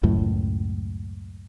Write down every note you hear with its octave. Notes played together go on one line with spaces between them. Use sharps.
C#2 F#2 A2